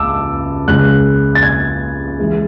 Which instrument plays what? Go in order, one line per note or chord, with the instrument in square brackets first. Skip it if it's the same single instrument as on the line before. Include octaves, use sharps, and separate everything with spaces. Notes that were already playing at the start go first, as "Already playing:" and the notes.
Already playing: [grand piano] C#2 C#3 A5 D6 E6
C#2 C#3 G#3 F#6
A6
G#6
E3 G#3